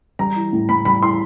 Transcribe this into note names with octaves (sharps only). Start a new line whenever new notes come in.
G3 A#5
E3
A2
A2 B5
G3 B5
E3 C6